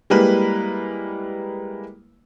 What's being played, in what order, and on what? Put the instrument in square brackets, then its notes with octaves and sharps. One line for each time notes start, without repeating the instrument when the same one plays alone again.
[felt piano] G3 G#3 A#3 E4 B4